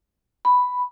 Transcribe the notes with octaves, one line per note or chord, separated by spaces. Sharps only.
B5